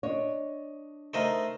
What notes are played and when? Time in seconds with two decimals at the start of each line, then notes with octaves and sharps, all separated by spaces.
0.03 D4 C#5 D#5
1.14 A3 D#4 A#4 C5 D#5